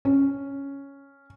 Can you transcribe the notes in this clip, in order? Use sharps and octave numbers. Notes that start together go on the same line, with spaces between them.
C#4